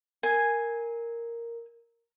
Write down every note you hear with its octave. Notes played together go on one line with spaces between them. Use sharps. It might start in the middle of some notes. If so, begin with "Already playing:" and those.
A#4 G#5